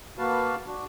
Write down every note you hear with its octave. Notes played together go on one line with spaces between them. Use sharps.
A#3 F#4 B4 F5 A5
D4 F#4